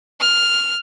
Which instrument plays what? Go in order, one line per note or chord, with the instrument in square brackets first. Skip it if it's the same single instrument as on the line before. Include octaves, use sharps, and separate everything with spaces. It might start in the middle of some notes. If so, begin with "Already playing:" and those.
[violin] F6